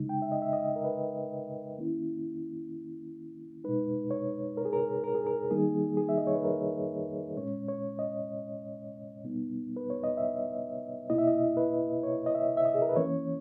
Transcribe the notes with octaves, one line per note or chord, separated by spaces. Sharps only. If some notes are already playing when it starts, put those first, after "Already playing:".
Already playing: C#3 G#3 D#4
G5
E5
D#5
E5
D#5
A#4
B4
D#3 A#3 C#4 E4
B2 G#3 D#4 B4
C#5
A#4
G#4
A#4
A#4
G#4
A#4
D#3 G3 A#3 D#4 G#4
G#4
E5
D#5
C#5
B4
A#4
A#2 G#3 C#4 C#5
C#5
D#5
B2 G3 B3 D#4
B4
C#5
D#5
E5
B2 A#3 E4 D#5
E5
D#5
B4
C#5
D#5
E5
E5
D#5
G#4
A#4
B4
E3 A#3 C#4 C#5